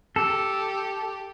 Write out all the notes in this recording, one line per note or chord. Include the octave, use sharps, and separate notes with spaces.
G4 A4